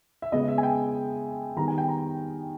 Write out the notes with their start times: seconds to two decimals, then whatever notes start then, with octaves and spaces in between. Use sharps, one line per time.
0.22 E5
0.32 C#3 G#3 B3 D#5
0.48 E5
0.58 G#5
0.63 G5
1.56 D#3 G3 B3 A#5
1.68 G#5
1.78 G5
1.88 A#5